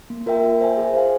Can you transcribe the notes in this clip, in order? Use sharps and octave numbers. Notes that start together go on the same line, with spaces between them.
A#3
F4 A#4 E5 G5
F4
C5 E5 G#5
G#4
C5 F5 G#5